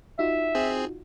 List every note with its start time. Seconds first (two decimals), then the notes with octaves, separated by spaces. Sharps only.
0.19 D#4 F4 F#4 E5
0.55 C4 G#4